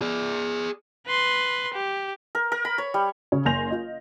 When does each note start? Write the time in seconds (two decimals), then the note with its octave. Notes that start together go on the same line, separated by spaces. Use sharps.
0.01 G#4 D5
1.07 B4 C6
1.74 G4
2.35 A#4
2.52 A#4
2.65 B5
2.78 C#5
2.94 G3
3.32 C#3 C#4 C#5
3.45 F#1 G#5 C6 G6 A#6 F7
3.70 F4 D#5